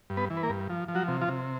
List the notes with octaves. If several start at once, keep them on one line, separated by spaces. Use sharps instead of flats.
G2
B3 B4
E3
B4
A#3 A#4
G2
F3
F3
F#3 F#4
C3
F3 F4
C3